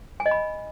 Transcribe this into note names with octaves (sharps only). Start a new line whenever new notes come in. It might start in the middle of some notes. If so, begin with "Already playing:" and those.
G#5
D#5
B5